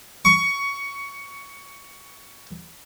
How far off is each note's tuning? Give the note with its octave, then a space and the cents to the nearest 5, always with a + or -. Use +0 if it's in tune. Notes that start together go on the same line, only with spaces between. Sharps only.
C#6 +15